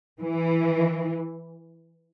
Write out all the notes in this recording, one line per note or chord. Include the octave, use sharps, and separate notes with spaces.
E3